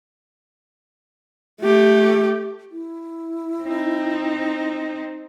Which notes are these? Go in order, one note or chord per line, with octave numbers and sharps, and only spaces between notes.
A3 G4
E4
C4 D#4